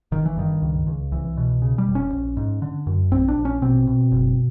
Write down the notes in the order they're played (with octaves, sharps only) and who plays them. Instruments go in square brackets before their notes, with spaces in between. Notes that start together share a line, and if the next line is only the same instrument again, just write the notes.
[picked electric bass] G1 D#3
E3
G2 D#3
C#2
C#2
C2 E3
B2
C#3
G3
F1
C#4
A#1
G#2
D3
F#2
A#1 C4
D4
A#1
C#4
B2 C4
B2
F#1